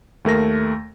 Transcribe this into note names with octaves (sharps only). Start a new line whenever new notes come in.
D#2 A3 A#4 A#6